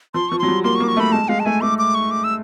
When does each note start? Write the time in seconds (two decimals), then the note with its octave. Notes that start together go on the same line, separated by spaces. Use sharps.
0.14 F3 C6
0.29 F3 C#6
0.39 F#3 C6
0.48 G3
0.64 A#3 C6
0.76 C#6
0.80 A#3
0.84 D6
0.88 C#6
0.97 A3
1.00 B5
1.12 G#3 A5
1.28 G#3 F5
1.40 A5
1.45 A3 G#5
1.61 A3 D6
1.78 D6
1.95 C#6
2.11 D6
2.24 E6